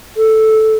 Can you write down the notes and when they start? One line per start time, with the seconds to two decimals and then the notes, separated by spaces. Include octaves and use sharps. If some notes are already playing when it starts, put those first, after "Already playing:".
0.17 A4